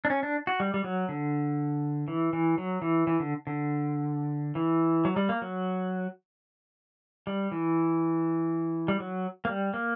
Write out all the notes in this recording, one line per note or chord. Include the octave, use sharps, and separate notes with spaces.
D4
C#4
D4
F#4
G3
G3
F#3
D3
E3
E3
F#3
E3
E3
D3
D3
E3
F#3
G3
A#3
F#3
G3
E3
G3
F#3
A#3
G3
A#3